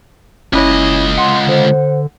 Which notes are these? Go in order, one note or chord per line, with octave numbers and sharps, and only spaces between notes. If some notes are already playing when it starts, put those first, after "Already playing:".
F#1 C#2 C#4 E4 C#5 D#5
F#5 C6
D3 C5